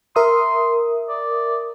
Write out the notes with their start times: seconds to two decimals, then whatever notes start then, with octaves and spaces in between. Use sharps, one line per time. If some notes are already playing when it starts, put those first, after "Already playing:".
0.16 A#4 E5 C6 D#6
1.09 D5